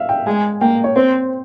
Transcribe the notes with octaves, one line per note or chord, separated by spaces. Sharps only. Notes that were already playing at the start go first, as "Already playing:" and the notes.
Already playing: E5 F5
G5
G#3 G#5
A#3 G5
C#5
C4 C5